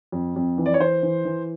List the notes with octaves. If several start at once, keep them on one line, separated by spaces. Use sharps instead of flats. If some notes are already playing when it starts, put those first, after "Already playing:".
F2
F2
E3
D5
C#5
E3 C5
E3
E3